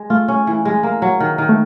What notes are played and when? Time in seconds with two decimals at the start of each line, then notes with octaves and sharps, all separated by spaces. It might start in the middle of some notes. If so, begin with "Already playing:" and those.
Already playing: G#3
0.10 A3 F4
0.28 C#4
0.47 E3
0.65 G#3
0.83 A#3
1.02 F#3
1.20 D#3
1.38 D#3
1.49 A3